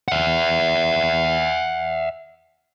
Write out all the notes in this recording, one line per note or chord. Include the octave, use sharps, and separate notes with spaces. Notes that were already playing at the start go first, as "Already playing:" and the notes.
E5 F#5